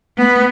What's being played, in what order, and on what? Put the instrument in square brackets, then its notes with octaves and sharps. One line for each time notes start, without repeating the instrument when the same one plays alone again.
[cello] B3